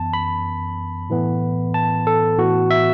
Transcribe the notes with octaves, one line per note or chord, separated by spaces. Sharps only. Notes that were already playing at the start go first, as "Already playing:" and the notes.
Already playing: F#2 E3 B3 A5
B5
A2 E3 B3
A5
A4
A2 E3 B3 F#4
E5